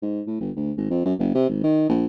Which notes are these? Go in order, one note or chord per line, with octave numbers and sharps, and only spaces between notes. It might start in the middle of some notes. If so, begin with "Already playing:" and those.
G#2
A2
G1
D2
G#1
F2
F#2
F#1
C3
G#1
D#3
A#1